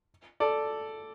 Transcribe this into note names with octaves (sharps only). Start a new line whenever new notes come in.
A4 D5